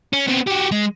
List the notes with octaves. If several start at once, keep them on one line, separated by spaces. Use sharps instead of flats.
C#4
B3 C4
F#4 G4
G#3